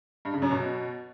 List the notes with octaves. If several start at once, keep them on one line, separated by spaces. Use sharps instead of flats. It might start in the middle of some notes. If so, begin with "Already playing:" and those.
G2
C#3
F#2
B2